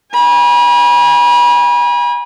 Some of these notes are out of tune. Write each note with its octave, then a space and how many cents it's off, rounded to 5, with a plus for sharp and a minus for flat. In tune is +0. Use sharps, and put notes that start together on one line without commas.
G#5 -30 B5 -40